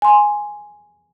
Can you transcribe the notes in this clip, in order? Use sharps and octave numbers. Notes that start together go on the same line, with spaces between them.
G#5 C6